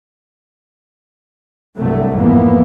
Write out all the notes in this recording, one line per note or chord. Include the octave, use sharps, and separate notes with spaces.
C2 G2 F#3 A3
F2 G#2 E3 A#3 B3